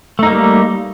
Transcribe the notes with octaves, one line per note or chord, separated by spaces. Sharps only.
G3 A3 A#3 D#4